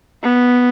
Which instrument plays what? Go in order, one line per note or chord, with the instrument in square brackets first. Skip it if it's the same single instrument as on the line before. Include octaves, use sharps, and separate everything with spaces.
[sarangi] B3